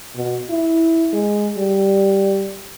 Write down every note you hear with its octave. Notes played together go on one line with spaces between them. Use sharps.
B2
E4
G#3
G3